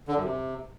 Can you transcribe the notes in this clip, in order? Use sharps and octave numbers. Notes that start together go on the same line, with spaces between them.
D3
F#2
C3